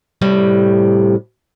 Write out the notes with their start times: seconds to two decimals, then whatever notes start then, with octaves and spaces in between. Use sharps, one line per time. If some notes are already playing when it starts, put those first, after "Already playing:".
0.22 A2 C3 G3